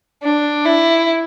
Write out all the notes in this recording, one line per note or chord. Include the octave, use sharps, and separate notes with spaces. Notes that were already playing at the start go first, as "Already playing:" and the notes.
D4
E4